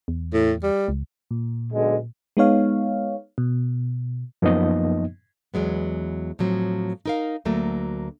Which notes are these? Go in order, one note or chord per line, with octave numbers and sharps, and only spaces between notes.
E2
A2
G3
C#2
A#2
B1 D3 G#3
G#3 B3 D#4 C#5 F5
B2
F#2 F3 A#3 B3 D#4 D#5
E2 F#3 G#3 B3
A2 F3 F#3 C4
D#4 A#4 F5
D2 F#3 A3 A#3